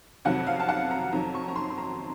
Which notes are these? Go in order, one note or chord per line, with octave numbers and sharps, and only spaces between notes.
F2 C3 D#3 F#3 F#5
F5
A5
F#5
A#5
F2 D#3 F#3 A#5
C#6
A#5
C6
C6
A#5